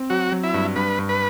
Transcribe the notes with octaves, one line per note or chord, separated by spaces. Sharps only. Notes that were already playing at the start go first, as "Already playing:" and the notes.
Already playing: C4
F#3 F#4
F#3
E4
G2
G2 B4
G2
B4